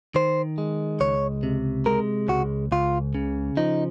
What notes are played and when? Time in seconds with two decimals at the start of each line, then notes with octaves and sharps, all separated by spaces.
0.15 D#3 C5
0.58 G#3
1.00 C#2 C#5
1.43 C3
1.86 G#3 A#4
2.29 C#2 F#4
2.72 C#2 F4
3.15 C#3
3.57 F3 D#4